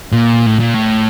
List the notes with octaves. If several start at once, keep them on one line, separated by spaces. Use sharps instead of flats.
A#2
A2
A#2
A2